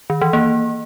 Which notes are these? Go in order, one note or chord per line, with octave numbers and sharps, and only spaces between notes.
D#3
E3
A#3